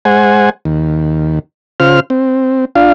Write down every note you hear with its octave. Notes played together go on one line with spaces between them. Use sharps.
G#3 C5 F#5 G#5
D#2
C#3 F4 C5 F6
C4
D4 F4 F5